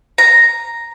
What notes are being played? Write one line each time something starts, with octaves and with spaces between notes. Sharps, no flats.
A#5